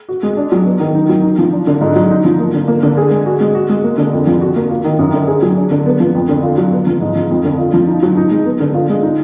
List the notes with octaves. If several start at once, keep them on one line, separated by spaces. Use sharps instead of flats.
F#4
G#3
D4
F#3
B3
D#3
D#4
F#3
D#4
F3
D4
D3
G#2
F#3
D#4
F3
A#3
D3
A#3
D3
G#4
G#3
F#4
G#3
F#4
G#3
A#3
D3
F2
F3
F#4
A#3
F4
D#3
F#2
D3
G#4
F#3
D4
D3
B3
F3
F2
D3
F4
F#3
B3
F3
G#2
F3
F2
D3
F4
F3
D#4
F#3
D#4
G#3
B3
D3
F4
G#3
D#4